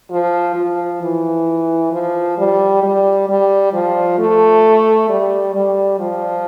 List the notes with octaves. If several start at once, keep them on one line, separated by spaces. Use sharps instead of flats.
F3
F3
E3
F3
G3
G3
G3
F3
A3
G3
G3
F3